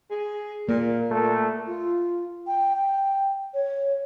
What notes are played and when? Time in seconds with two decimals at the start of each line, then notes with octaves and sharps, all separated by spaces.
0.11 G#4
0.69 A#2 A#3
1.11 A#2 A3
1.66 F4
2.47 G5
2.76 G5
3.54 C#5